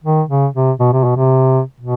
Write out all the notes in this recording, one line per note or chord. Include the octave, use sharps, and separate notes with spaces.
D#3
C#3
C3
B2
C3
B2
C3
B2